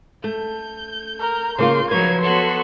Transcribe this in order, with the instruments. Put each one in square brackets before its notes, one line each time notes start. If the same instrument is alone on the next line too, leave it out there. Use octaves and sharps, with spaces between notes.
[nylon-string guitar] A3 [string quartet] G6
[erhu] A#4
[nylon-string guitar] C#3 A#3 F4 [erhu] C6
[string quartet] F3 F#3 D#4 [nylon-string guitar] B4 C#5 [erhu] G#6
[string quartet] B3 F#4 A4 [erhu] C6